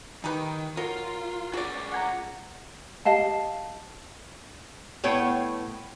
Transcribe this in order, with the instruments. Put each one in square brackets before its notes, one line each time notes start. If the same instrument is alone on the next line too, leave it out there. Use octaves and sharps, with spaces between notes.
[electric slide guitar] D#3 [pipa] D#4 G4 B4
[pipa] F#3 [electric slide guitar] F4 [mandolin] A#4
[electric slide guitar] F4 G#4 [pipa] F#4 D5
[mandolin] F#5 G#5 A#5
[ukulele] G4 D#5 F5 A5
[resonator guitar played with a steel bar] A2 B3 C#5 G5